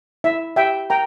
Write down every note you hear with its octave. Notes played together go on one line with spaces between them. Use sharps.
E4 E5
G4 E5 G5
A#4 G5 A#5